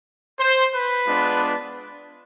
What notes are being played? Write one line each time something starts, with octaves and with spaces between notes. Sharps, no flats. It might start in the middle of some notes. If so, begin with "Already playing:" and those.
C5
B4
G#3 B3 D4 F4